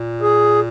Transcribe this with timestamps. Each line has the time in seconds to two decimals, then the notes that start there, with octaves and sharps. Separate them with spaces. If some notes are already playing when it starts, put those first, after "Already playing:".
Already playing: A#2
0.22 G#4